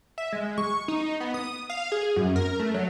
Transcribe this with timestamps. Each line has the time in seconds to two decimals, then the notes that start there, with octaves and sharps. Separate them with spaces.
0.18 E5
0.32 G#3
0.58 C#6
0.88 D#4
1.20 B3
1.34 D#6
1.70 F5
1.92 G#4
2.16 F#2
2.36 A#4
2.59 A3
2.74 F#3